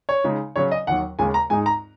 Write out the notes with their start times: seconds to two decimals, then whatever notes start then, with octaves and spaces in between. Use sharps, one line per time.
0.09 C#5
0.24 C#3 G#3 D#4
0.56 C#3 F#3 C#4 C#5
0.71 D#5
0.87 D#2 D#3 F#3 F#5
1.19 D#2 C#3 G#3 G#5
1.34 A#5
1.50 G#2 G#3 D#4 G#5
1.66 A#5